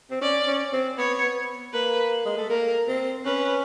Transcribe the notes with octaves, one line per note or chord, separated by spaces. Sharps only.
C4
C#4 D5
C#4
C4
B3 C#5
B3
A#3 B4
G#3
A3
A#3 A#4
C4
C#4 B4